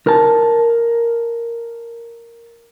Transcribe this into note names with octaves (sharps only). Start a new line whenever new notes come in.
A#4 A5